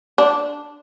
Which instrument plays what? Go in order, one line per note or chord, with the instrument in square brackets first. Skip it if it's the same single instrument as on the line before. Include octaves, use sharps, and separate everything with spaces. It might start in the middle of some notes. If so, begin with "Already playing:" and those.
[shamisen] D4